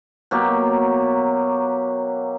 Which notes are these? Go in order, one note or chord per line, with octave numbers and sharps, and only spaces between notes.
B2 F#3 A#3 G4